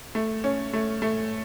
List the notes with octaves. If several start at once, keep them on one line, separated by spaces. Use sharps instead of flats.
A3
C#4
A3
A3